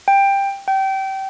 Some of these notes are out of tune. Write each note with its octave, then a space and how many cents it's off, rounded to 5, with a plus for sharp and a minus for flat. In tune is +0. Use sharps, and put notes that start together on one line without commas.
G5 +15
G5 -25